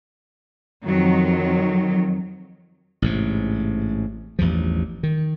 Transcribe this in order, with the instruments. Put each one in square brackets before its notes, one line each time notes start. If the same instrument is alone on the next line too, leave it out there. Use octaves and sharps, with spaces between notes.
[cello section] F2 D#3 F#3
[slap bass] A1 G#2 C3
A1 E2 G2 F3
D#3